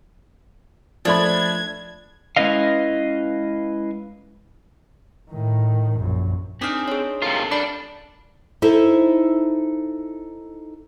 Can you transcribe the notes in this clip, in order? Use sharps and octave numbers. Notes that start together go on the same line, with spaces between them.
F3 A3 D4 B5 G#6
G#3 C#4 E4 B4 D#5 F5
A2 D#3
A#1 F#2
C4 D4 D#4 G#4 F6 B6
G#4 C5 C#5
C3 F4 A4 A#4
G3 D4 G4 D5 B5
D#4 E4 A4 C5 E5